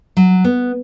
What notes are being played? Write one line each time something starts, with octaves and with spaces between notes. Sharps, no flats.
F#3
B3